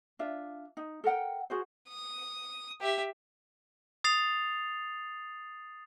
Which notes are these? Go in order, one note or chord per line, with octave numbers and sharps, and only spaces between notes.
D4 F4 E5
D#4
A4 A#4 F#5 G5
F#4 G#4 C5
D#6
G4 E5
D#6 A6 C7 F7